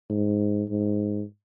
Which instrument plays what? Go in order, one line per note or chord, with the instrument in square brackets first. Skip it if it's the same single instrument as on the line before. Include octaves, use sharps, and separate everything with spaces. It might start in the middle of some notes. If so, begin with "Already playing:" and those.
[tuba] G#2
G#2